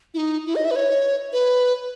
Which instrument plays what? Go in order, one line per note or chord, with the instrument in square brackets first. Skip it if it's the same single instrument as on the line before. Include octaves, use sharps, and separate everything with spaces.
[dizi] E4
D#4
E4
D#5
E5
B4
C#5
B4